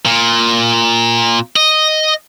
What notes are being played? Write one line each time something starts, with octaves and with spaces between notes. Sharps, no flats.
A#2
D#5